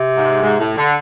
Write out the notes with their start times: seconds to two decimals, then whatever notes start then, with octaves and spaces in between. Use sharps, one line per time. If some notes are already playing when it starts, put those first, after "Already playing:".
Already playing: C3
0.16 G#2
0.42 G#2
0.59 A2
0.77 D3